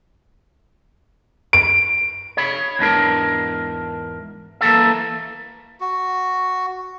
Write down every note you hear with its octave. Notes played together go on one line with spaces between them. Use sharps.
D7
C#5 B5
E2 G#2 D4 A#4
E3 A#3 A4 E5
F#4